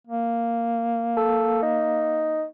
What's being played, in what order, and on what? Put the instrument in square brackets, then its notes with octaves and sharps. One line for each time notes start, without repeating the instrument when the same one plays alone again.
[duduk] A#3
[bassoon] A4
D#4